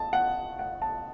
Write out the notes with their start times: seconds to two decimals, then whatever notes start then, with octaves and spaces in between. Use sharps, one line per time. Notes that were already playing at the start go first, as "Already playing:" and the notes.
Already playing: A5
0.13 F#5
0.59 F#5
0.82 A5